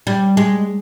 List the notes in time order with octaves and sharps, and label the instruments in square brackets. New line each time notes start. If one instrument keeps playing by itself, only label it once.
[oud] G3
G#3